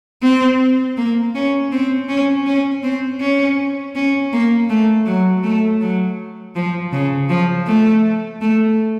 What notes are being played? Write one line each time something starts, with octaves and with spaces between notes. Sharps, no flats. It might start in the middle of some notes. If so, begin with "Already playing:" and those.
C4
A#3
C#4
C4
C#4
C#4
C4
C#4
C#4
A#3
A3
F#3
A3
F#3
F3
C#3
F3
A3
A3